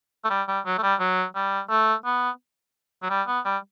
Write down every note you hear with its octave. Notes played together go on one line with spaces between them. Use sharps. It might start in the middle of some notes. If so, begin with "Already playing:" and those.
A3
G3
G3
F#3
A3
G3
F#3
G3
A3
B3
F#3
G3
B3
G3